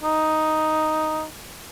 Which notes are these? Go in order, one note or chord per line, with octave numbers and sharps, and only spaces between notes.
D#4